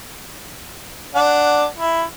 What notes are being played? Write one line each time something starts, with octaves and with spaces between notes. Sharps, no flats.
D4 F#5
E4